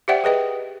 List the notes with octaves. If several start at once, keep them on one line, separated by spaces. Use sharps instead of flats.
G4 C5 D5 E5 F#5 G5
G#4 B4 D#5 G5